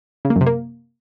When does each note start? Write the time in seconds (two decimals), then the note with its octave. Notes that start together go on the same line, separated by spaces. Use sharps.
0.25 C#3
0.30 A#3
0.36 F#2
0.41 C3
0.46 A#3